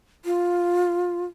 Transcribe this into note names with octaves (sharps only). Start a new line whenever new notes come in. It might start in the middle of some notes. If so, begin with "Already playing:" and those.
F4